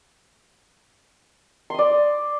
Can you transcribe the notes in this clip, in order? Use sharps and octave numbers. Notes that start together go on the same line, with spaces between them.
D5 C6 D#6